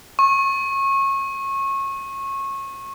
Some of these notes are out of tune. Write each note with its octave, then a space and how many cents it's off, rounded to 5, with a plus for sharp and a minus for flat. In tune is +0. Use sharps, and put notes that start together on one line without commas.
C#6 -25